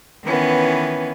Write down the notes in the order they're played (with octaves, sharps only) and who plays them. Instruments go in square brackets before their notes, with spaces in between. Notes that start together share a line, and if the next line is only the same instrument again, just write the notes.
[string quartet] D#3 E3 B3 C#4